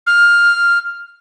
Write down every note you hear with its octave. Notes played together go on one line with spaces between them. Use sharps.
F6